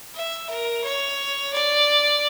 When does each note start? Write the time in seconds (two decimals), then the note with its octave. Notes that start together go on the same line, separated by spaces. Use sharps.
0.15 E5
0.50 A#4
0.84 C#5
1.53 D5